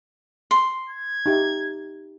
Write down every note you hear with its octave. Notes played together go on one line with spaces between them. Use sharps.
C6
G#6
D#4 G4 E5